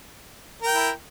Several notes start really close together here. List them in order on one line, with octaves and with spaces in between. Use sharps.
A#4 G5 E4